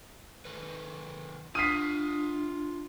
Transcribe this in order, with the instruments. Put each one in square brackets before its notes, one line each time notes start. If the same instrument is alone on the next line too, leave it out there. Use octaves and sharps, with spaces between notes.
[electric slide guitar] D#3 A4 B4
[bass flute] D4 [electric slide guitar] F4 F#5 [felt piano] D#6 F6 B6 [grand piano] C7 D#7